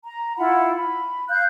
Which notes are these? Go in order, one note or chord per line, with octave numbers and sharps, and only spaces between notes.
A#5
E4 F4 F#5 B5
B5
F5 F#6 G6